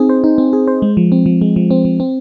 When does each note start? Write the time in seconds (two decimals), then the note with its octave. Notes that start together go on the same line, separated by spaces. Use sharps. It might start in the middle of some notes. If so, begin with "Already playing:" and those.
Already playing: C4 D#4 G#4
0.09 C5
0.24 D#4
0.38 C4
0.53 G#4
0.67 C5
0.82 G#3
0.97 F3
1.12 C4
1.26 F3
1.41 G#3
1.56 F3
1.70 C4
1.85 F3
2.00 C4